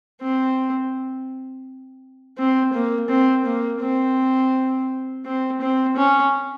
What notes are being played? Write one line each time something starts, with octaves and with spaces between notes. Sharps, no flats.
C4
C4
A#3
C4
A#3
C4
C4
C4
C#4